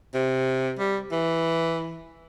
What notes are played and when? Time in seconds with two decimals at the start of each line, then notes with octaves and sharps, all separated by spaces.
0.14 C3
0.79 G3
1.12 E3